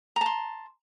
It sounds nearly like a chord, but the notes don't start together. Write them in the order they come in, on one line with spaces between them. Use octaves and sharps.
A#5 A5 C6